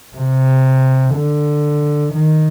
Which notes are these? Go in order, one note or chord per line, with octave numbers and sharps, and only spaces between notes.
C3
D3
D#3